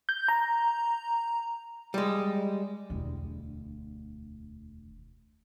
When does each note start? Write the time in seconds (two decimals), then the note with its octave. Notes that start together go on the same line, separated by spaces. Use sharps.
0.09 G6
0.28 A#5
1.94 G3 G#3
2.90 E1 D2